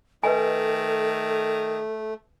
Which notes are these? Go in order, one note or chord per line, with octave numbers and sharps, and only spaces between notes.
D#3 A3 A4 B4 D#5 G#5